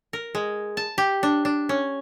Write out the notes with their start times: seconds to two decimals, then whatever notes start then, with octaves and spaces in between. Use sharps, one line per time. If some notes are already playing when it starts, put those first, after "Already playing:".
0.13 A#4
0.35 G#3
0.77 A5
0.98 G4
1.23 D4
1.45 D4
1.69 C#4